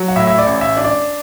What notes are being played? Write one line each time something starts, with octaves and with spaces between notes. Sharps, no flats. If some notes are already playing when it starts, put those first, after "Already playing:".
Already playing: F#3
F#5
A2 E5
E5
D5
A1
E5
D4
D5